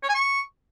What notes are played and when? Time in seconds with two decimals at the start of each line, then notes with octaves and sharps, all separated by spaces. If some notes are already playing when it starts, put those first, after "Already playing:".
0.03 C#5
0.09 G#5
0.15 C#6